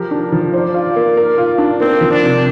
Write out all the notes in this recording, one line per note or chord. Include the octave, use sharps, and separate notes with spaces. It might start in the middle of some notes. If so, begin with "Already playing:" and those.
Already playing: F3 G4 A#4
D4
F3
C5 D5
F4
A#3
A#4
F4
D4
A#3 C4
F3
D4
C3